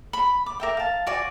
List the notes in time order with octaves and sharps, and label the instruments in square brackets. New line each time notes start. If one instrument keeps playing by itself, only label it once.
[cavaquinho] B5
D6
A#4 E5 G5
F5 A5
F#4 D5 G#5